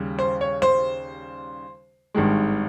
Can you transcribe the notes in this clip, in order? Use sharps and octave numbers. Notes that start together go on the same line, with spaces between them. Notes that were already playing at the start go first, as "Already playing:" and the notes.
Already playing: D#2 C#3 G3
C5
C#5
C5
G#1 G2 D#3 G#3